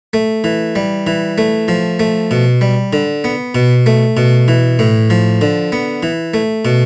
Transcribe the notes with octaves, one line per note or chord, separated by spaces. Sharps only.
A3
E3
G3
E3
A3
F3
A3
B2
G3
D3
B3
B2
A3
B2
E3
A2
F3
D3
B3
E3
A3
B2